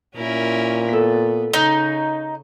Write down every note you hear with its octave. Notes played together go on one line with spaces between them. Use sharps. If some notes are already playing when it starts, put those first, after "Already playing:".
A#2 C#4 E4 A#4
B3 A4 B6
C#3 D#4